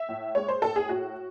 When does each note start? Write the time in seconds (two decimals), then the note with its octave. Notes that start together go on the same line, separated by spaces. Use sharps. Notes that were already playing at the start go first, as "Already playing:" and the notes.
Already playing: E5
0.09 A2
0.35 G#3 C#5
0.48 C5
0.62 A2 A4
0.76 G#4
0.89 A2 F#4